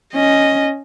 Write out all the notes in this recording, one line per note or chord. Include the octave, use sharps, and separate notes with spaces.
C#4 D#5